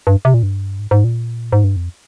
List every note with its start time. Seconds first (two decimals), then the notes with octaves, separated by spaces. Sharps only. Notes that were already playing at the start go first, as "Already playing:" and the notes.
0.07 G2
0.25 C3
0.34 A#2
0.43 G2
0.79 G#2
0.91 G#2
1.04 A#2
1.53 G#2
1.64 G2
1.76 F2